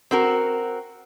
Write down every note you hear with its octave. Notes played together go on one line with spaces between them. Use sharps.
C4 F#4 A#4